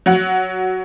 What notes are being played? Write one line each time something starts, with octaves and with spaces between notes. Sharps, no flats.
F#3 F#5